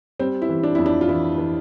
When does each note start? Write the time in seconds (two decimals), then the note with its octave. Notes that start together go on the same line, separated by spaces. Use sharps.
0.20 G3 C4
0.42 E4
0.49 E3
0.63 D4
0.75 F2 E4
0.86 D4
1.01 F4
1.08 E3 E4
1.38 E3